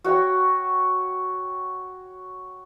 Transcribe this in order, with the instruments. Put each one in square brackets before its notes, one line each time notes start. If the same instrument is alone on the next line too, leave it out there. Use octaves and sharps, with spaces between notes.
[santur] F#4 C#5 F#5 G5